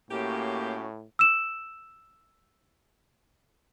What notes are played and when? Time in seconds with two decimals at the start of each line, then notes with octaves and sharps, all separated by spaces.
0.11 A2 A#3 C#4 F#4 G4
1.19 E6 E7